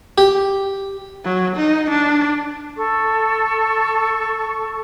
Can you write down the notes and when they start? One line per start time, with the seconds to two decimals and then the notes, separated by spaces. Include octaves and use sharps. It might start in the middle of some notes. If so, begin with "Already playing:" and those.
0.18 G4
1.24 F#3
1.56 D#4
1.90 D4
2.77 A4 C#6